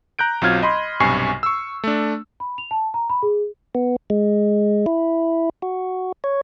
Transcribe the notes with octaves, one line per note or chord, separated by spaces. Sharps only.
A#5 F#6 G6 D7
B1 F#3 C4 F4 F6 G#6
D#5 B5 C6
B1 G2 C3 G#5 C#6 C7
C#6 E6
A3 D4
B5
F7
A5
A#5
B5
G#4
B3
G#3
E4
F#4
C#5